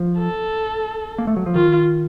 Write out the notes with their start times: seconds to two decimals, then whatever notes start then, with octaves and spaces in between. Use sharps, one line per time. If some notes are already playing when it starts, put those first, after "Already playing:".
Already playing: F3
0.18 A4
1.18 A#3
1.27 A3
1.37 F#3
1.46 F3
1.55 D#3 F4